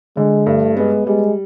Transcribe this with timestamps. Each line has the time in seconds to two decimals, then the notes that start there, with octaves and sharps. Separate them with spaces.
0.17 D3 G#3
0.46 G2 A3
0.77 G#3 B3
1.07 G3 G#3